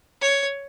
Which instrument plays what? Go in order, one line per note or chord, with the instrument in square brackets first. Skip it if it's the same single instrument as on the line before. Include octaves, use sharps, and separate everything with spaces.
[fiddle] C#5